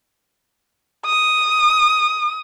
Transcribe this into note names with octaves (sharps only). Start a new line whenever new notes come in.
D#6